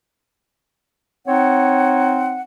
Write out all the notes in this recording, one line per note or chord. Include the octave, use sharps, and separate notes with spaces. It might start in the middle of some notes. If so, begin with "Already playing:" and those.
C4 D#4 C#5 F#5